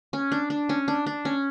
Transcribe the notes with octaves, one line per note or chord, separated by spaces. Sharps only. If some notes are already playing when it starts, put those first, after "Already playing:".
C#4
D4
D4
C#4
D4
D4
C#4